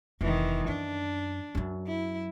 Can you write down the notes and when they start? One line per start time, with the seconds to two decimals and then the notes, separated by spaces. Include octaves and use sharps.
0.21 F1 D#3 E3
0.68 F#2 D4
1.55 F#2 F#3
1.87 E4